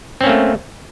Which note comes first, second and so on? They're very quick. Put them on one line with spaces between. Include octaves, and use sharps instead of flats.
C4 C#4 A#3 A3